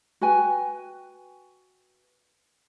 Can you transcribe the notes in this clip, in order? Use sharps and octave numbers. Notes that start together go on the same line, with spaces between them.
F#4 B4 G5 G#5